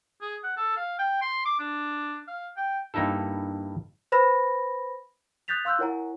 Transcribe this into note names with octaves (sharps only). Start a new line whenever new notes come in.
G#4
F#5
A4
F5
G5
C6
D6
D4
F5
G5
G2 A#3 D#4 E4 A4
B4 C5 B5 A#6
D#6 F#6 G6 A6 B6 F7
F5 C6 E6 F#6 G6
E4 A#4 C#5 F#5 G#5 A#5